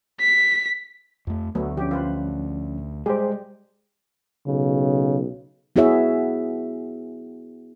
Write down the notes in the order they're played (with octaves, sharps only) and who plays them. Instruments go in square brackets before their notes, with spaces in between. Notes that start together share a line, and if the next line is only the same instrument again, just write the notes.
[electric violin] B6
[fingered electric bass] F2 A3
[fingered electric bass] D2 [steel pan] F#3 A3 B3
[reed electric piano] F3 C#4 [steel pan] G4
[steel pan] F4 B4 C5
[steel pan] G3 G4 [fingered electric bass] G#3 [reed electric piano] G#4 C5
[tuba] B1 [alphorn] C#3
[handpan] B3 E4 F#4 G#4 C#5 E5